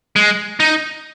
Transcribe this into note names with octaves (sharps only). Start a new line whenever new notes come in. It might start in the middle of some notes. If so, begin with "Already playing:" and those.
G#3
D#4